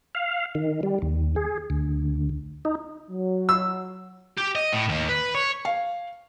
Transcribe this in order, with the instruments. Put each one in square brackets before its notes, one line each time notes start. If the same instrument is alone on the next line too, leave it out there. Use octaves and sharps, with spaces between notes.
[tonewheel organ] F5
D#3
G3
D#2
G#4
D2
D#4
[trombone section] F#3
[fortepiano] E6
[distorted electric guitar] G4
D#5
A2
D#2
B4
C#5
[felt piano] F5